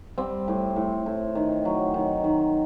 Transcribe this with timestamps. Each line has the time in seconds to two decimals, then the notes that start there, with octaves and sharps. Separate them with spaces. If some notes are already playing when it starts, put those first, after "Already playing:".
0.18 G3 C4
0.48 A2
0.76 A2
1.06 A2
1.35 D#3
1.65 F#3
1.94 D#3
2.24 D#3